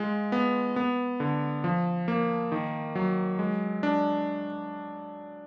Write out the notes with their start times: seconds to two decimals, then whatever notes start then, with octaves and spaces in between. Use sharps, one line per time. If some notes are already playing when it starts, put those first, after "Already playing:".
Already playing: G#3 F4
0.32 B3
0.76 B3
1.20 D3
1.64 F3
2.08 A#3
2.52 D#3
2.95 F#3
3.39 G#3
3.83 D4